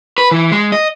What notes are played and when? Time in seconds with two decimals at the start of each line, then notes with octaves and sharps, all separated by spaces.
0.18 B4
0.31 E3
0.52 G#3
0.72 D#5